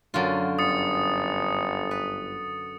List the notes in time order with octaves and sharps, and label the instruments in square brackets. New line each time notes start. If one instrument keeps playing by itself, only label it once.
[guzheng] F#2 D3 F4 [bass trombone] F#3
[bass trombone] G1 [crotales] D#6 A6 C#7
[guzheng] B4